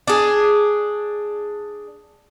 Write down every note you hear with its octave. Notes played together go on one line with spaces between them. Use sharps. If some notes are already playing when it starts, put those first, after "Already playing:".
D4 G#4